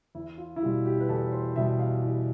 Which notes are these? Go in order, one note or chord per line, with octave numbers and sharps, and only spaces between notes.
E2 E4
F4
E4
B2 G3 F4
G4
B4
E2 A4
C5
B2 G3 E5
F5
E2 G4